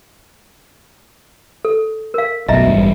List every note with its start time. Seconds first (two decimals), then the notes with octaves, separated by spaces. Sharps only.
1.65 A4
2.14 A#4 F5
2.48 B1 F#2 B2 D#5 E5 A#5
2.67 A1 G2